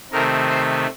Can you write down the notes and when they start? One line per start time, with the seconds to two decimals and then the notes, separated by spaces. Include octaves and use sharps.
0.12 C3 D#3 A3 C4 A#4
0.49 C5